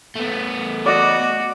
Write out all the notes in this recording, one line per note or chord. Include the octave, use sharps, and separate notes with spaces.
A3 B3
F#4 D5 D#5